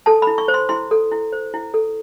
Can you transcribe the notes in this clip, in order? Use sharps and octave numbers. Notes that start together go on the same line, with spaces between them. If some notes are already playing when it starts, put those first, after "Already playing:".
A4 A5
B5
E4
C#6
C5
C6
E4 C6
A4
E4
C5
E4
A4